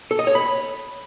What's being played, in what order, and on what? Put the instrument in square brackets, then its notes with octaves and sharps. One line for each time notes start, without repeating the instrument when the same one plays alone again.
[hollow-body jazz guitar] A4
D#5
C#5
B5